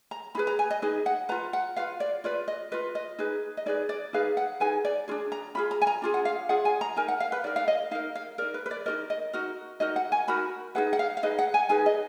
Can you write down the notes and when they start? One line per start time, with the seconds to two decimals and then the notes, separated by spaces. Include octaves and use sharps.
0.11 A#5
0.35 D#4 G#4 B4 B5
0.47 A#5
0.59 G#5
0.71 D#5
0.82 D#4 G#4 B4 D#5
1.06 F#5
1.29 F4 B4 A#5
1.53 F#5
1.76 F4 B4 F5
2.00 D5
2.24 F4 B4 D5
2.48 D#5
2.72 F4 B4 D#5
2.95 D#5
3.19 D#4 G#4 B4
3.57 D#5
3.66 D#4 G#4 B4 D5
3.89 D5
4.13 D#4 G#4 B4 F5
4.37 F#5
4.60 D#4 G#4 B4 G#5
4.85 D5
5.08 D4 F4 G#4
5.32 A#5
5.55 D4 F4 G#4 B5
5.71 A#5
5.82 G#5
5.87 A#5
6.02 D4 F4 G#4
6.14 F#5
6.25 F5
6.49 D4 F4 G#4 F#5
6.65 G#5
6.81 A#5
6.96 D#4 A#4 G#5
7.08 F#5
7.20 F5
7.32 B4
7.44 D#4 A#4 D5
7.56 F5
7.68 D#5
7.91 D#4 F5
7.95 A#4
8.15 F5
8.38 A#4 D5
8.42 D#4
8.54 B4
8.66 B4
8.71 D5
8.86 D#4 F#4 A#4 D#5
9.10 D#5
9.33 D#4 F#4 A#4
9.80 D#4 F#4 A#4 D#5
9.96 F#5
10.12 G#5
10.27 D#4 F#4 A#4 B5
10.75 D#4 G#4 B4 F#5
10.93 F#5
10.99 F5
11.17 F5
11.23 D#4 G#4 B4 D#5
11.39 F#5
11.54 G#5
11.69 D#4 G#4 B4 G#5
11.86 D#5